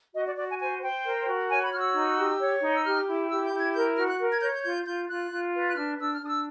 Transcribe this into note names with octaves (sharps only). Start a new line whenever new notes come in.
F#4 D#5
D5
F#4 D5
G#5
C5 G#5
C5 G5
A#4
F#4
C#5 G#5
B5
F#4 F6
E6
D#4
G4
C#5
D#4
E6
G4 F6
E4
G4 E6
G6
E4
G#6
A#4 G6
F#4 F6
F#6
A#4
G#6
C#5 G6
G6
F4 G6
F4 G6
F4 F#6
F4
B4
F#6
D4 F6
D4 E6
F6
D4 D#6
E6